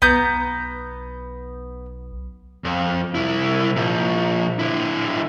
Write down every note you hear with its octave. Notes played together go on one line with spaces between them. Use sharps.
B1 B3 A#5 G6
F2
C2 E4
A#2 F3
D3 E4